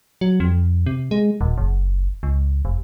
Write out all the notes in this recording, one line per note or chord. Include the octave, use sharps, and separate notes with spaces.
F#3
F2
C3
G#3
D#1
F#1
C#2
F1